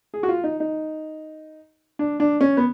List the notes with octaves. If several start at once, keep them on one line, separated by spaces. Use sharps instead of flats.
G#4
F#4
F4
D#4
D#4
D4
D4
C#4
B3